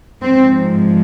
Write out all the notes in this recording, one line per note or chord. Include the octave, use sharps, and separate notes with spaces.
G#2 F3 G#3 C4